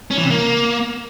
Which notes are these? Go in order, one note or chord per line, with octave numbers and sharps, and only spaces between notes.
C#4
E3
C3
A#3